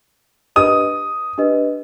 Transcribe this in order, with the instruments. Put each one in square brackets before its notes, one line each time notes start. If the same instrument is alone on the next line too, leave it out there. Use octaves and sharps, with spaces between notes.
[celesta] D4 G4 B4 D#5 [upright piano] D#6
[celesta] D4 G4 B4 D#5